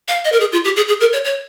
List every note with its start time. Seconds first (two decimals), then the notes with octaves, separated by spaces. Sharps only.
0.08 F5
0.25 D#5
0.32 A#4
0.40 G#4
0.52 F4
0.65 G4
0.76 G#4
0.88 G#4
1.01 A#4
1.13 C#5
1.25 C#5